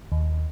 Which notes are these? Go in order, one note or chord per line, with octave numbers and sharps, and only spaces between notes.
D#2